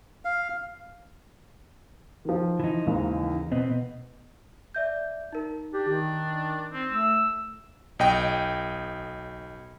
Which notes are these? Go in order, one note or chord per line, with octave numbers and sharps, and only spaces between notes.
F5
D#3 F3
E3 D#4
D#2 G#2 C#3
B2 B3 C4 D#5
D5 E5 G6
D#4 A#4
D4 G4
D#3
C4
A3 E6
B1 D#5 G5